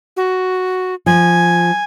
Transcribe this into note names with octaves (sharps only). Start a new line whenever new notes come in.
F#4
F3 G#5